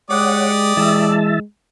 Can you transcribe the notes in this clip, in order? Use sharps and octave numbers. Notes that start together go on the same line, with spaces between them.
G#3 G4 C#5 D5 F#5 D#6
E3 G#3 E5 A5